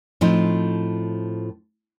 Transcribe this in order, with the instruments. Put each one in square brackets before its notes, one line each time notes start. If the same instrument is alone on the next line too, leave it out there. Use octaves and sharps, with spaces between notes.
[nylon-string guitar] A2 F3 C4 D#4